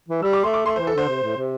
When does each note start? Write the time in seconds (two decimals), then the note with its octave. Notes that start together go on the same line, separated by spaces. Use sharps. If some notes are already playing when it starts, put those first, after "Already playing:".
0.08 E3
0.22 G3 E6
0.33 D6
0.43 A3 C6
0.54 D6
0.65 A3 C6
0.76 C5
0.79 E3
0.87 A4
0.95 D3 C5
1.08 C3
1.23 A2
1.37 C3